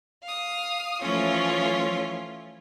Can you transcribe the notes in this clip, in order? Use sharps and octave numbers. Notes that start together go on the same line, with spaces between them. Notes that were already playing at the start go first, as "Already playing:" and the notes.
F5 D#6
E3 F3 A3 C#4 F4 C#5